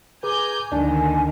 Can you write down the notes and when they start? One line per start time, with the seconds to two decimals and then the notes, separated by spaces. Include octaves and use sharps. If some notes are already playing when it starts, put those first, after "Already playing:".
0.23 G#4 B4 G#5 A#5 D6 G6
0.72 D2 D3 D#3 A#3 D4 G#5